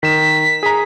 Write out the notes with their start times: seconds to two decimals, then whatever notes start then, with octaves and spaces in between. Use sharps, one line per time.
0.03 D#3 B6 E7
0.63 G#4 A#5